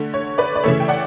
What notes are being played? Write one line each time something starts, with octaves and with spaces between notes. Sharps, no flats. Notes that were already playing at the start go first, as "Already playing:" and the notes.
Already playing: D3 A3
C#5
B4 D5
D5
C#3 E3 A3 C#5 E5
G5
D5 F#5